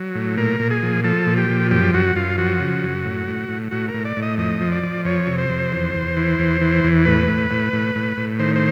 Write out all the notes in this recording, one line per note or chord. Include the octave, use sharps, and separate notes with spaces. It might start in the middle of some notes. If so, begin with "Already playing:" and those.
Already playing: F#3
A2
A#2 A#4
A#2
G#4
F3
F3 A4
A#2
G4
F3
F#2 G4
F#2 F#4
F#2 F4
F3 F#4
C#3
F#2
A2
A2
A2
A2 F#4
A#4
A2
D5
A2
D#5
F2 D#5
F3
D5
F3
F2 C#5
C3
C5
F2
E2
E2
E3
E2
E3
E2
A2 B4
A2
A2
A2
A2
A2
D#3 C5
C5